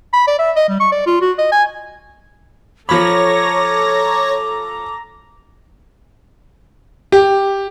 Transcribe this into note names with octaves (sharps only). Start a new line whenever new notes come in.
B5
D5
E5
D#5
G3
C#6
D5
F4
F#4
D#5
G#5
F3 A4 C#5 A#5 B5 D6 A#6
G4